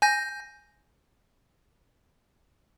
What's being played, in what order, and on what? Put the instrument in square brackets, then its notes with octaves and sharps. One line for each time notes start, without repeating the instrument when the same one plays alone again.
[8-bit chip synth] G#5 G6 A#6